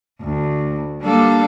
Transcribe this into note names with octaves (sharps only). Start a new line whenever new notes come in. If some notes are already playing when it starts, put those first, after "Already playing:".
D2
G3 A#3 D4 A4 D5 F5